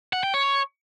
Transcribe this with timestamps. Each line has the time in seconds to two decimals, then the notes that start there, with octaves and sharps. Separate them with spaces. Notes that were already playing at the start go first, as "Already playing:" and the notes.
0.13 F#5
0.23 G5
0.34 C#5